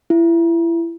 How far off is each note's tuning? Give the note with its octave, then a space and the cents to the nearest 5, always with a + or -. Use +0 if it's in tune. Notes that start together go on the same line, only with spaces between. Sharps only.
E4 +25